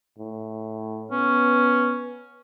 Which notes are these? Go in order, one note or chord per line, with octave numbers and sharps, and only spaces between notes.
A2
B3 C#4